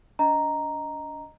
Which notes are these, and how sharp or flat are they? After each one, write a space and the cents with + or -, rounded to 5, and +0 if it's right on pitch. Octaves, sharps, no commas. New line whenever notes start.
D4 -45 D#5 +0 A#5 +0